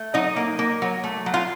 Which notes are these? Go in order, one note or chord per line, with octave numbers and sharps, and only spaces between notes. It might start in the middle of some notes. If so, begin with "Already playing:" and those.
Already playing: A3
F#3 D#4 D#5
A#3
A#3
F#3
A3
F#3
F4 F5